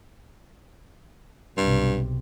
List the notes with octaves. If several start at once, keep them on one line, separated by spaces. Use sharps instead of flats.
B1 G2 C3